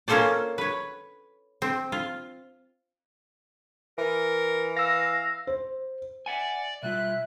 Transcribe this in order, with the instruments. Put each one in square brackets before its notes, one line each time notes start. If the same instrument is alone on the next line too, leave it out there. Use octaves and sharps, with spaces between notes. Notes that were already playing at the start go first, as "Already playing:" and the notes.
[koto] A#3 C#4 F4 A4 C5 D5
B4 C#5
C4
F4
[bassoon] E3 [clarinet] A#4
[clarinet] F5 [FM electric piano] E6 A#6
[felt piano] C5
[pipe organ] D5 [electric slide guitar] E5 F#5 G#5
[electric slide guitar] B2 G3 F4 [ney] E5 [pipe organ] F#6